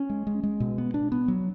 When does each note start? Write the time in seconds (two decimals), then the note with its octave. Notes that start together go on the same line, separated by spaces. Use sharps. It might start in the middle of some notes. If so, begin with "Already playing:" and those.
Already playing: C#4
0.10 G#3
0.27 G#3
0.43 G#3
0.60 B2
0.78 B3
0.94 D4
1.12 B3
1.28 F#3